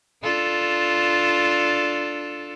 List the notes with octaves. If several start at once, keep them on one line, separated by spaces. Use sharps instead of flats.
D4 F4 A4